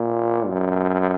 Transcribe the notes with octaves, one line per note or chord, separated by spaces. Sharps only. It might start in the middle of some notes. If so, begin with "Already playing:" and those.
Already playing: A#2
F#2